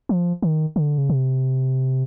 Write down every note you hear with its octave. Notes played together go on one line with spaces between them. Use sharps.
F3
D#3
D3
C#3
C3